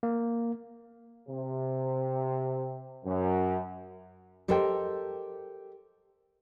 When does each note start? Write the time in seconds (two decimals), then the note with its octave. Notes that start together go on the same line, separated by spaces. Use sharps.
0.03 A#3
1.28 C3
3.05 F#2
4.48 G4 A4 A#4 C5 D#5 G5